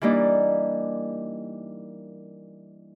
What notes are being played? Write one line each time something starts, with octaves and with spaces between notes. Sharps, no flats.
E3 G3 A#3 D4 D#4